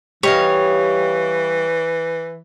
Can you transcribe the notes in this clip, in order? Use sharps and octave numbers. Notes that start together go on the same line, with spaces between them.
E3 G3 C#5 D#5 F5